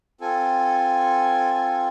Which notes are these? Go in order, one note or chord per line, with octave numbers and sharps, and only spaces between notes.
C4 F4 A4 G#5
G#5